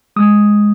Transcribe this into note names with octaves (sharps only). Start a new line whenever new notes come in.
G#3 D#6